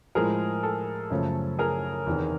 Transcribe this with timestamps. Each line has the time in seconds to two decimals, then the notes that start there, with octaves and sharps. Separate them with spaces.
0.15 A2 F3 G#3 G#4 A#4
0.63 A4
1.10 F#2 C#3 F3 A3
1.59 G#4 A#4
2.06 E2 C3 D#3